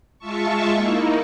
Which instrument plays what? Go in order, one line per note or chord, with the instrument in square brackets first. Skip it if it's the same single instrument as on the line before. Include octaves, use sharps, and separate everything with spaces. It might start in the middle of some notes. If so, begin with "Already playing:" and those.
[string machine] G#3 F4 E5 A5 C#6
A#3 D#4 E4